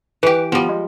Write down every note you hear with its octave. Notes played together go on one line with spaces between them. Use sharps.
E3 G4 B4
F3 G3 B3
G#3